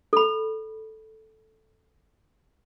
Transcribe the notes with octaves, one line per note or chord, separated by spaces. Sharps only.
A4 B5